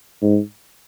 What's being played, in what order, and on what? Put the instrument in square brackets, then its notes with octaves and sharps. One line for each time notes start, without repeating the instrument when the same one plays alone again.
[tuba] G#2